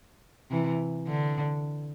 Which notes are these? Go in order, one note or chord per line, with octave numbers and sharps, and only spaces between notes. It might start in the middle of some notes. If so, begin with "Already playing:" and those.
C3 E3
D3